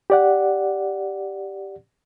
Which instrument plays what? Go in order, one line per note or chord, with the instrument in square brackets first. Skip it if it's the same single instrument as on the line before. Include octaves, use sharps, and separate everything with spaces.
[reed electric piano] G4 D5 F#5